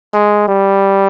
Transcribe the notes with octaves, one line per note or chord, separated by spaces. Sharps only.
G#3
G3